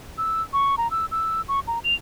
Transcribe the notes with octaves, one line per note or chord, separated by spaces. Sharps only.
E6
C#6
A#5
E6
E6
C#6
A#5
F7